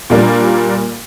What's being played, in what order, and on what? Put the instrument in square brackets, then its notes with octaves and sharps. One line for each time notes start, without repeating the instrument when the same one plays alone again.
[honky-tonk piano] A#2 G3 A#3 D4